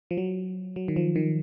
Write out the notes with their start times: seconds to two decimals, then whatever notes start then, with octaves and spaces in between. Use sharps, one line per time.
0.11 F3
0.18 F#3
0.76 F#3
0.88 D#3
0.96 F3
1.16 D#3